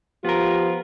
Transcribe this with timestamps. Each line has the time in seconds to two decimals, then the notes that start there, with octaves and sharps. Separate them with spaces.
0.25 F3 B3 F4 G4 A#4